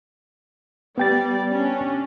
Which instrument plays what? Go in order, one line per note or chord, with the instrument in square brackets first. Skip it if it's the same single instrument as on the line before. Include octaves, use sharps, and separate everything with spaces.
[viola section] G3 D5 [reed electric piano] B3 G5 A6
[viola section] C#4 D4